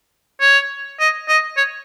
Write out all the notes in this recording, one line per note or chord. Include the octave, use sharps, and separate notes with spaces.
C#5
D#5
D#5
C#5